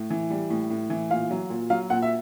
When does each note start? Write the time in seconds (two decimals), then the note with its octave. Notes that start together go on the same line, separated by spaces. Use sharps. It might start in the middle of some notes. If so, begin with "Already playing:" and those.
Already playing: A2
0.10 E3
0.30 G3
0.50 A2
0.70 A2
0.90 E3
1.10 A#2 F5
1.31 F#3
1.50 A#2
1.70 F#3 F5
1.90 A#2 F#5
2.02 E5